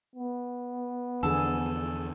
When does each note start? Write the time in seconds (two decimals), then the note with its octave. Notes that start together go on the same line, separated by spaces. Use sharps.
0.15 B3
1.23 E2 D3 F3 D4 G#4 A4